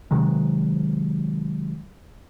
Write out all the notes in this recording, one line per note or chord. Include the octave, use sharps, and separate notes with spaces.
C3 D#3 F#3 G#3